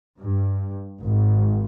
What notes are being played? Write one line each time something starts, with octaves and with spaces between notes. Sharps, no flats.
G2
G#1